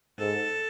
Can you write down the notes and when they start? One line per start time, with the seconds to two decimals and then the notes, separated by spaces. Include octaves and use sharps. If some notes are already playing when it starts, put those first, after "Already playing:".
0.19 G#2 A4